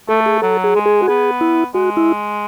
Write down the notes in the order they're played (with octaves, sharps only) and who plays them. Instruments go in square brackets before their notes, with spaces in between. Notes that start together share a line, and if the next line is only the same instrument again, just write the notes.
[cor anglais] A3 [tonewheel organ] A4
[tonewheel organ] G#4
[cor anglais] F#3 [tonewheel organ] A4
[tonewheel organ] G#4
[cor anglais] G#3
[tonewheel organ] G#4
F#4
[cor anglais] B3 [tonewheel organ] G#4
[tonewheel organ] E4
[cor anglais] G#3 [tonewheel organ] F#4
[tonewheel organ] E4